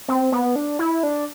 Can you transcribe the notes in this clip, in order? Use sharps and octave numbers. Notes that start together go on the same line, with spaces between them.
C4
B3
D4
E4
D4